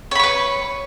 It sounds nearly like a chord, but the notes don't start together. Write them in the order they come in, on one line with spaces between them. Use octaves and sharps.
C#5 B5 C#6 B4